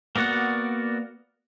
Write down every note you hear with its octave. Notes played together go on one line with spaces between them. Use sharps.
A#3 B3 F#4 D5 F#5